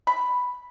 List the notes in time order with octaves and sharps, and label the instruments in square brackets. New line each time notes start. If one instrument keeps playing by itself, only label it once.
[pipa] B5